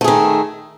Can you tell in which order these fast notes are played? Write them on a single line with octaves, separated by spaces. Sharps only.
A3 G#4 D#3